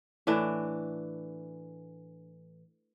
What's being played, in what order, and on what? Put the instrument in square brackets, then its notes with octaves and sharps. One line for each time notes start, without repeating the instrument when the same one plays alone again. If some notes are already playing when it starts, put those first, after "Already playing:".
[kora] A2 E3 D4